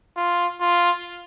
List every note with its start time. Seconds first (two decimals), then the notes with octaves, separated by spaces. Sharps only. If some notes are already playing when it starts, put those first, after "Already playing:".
0.17 F4
0.61 F4